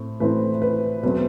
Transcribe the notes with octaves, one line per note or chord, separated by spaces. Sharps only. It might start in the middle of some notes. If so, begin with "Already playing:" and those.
Already playing: A2 C4
A2 E3 A3 C4 B4
B4
E2 B2 F#3 A3 C4 B4